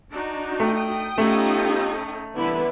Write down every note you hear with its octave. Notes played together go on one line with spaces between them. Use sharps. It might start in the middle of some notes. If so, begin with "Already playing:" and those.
D4 D#4 F#4
A3 G5 D#6
A3 B3 C#4 D#4 F4 G4 A4
C2 D3 E3 B3 E4 B4